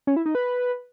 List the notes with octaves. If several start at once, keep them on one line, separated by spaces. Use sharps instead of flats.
C#4
E4
D#4
B4